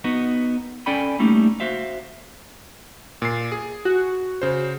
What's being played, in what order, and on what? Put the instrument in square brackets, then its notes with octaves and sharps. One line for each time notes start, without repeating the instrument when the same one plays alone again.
[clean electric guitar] B3 D#4 F#4
C#4 A4 D5 G5 G#5 B5
G3 A3 A#3 C#4 D#4 E4
F#4 C5 E5 F5
[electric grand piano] A#2 C7
G#4
[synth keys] F#4
[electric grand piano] C#3 C5